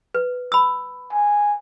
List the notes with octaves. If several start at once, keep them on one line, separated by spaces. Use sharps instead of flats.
B4
B5 E6
G#5